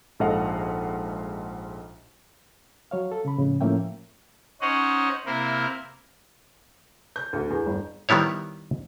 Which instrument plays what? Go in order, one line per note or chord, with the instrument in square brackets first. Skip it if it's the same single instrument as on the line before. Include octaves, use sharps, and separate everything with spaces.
[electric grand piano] A#1 G#2 A4 D#5 F5 F#5
[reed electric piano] F#3 C#5 F5
A4
C#3 B5
F2 A2 C#3
A2 F3 A#3 C#4 E5 G5
[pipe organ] C#4 D#4 C5 C#5 D#5 F#5
C3 A#3 E4 A#4 C5
[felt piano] G6
D2
E2
G1
[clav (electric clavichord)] D#3 G3 B3 E4 C#5